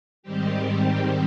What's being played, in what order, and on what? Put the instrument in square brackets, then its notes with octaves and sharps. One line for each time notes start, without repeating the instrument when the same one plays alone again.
[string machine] G#2 D#3 G3 C4 G4